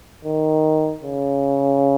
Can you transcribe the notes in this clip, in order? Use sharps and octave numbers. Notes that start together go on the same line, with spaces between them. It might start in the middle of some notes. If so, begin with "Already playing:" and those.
D#3
C#3